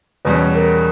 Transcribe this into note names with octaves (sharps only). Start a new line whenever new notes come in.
E2 B2 G3 C#4 B4
A#4